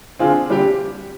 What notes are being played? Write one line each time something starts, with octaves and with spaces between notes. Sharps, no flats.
D3 F3 C4 F4 G#4
D3 G3 D4 G4